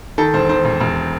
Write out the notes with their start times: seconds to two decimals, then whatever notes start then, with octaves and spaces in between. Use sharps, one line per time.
0.18 D#3 A4
0.34 E1 C5
0.49 D#3 C5
0.65 E1
0.81 E1